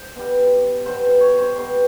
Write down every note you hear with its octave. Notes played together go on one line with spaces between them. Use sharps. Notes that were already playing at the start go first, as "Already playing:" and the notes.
Already playing: C5
B2 G3
B2 G3 C5
C5
C#5
C5
B2 G3 C5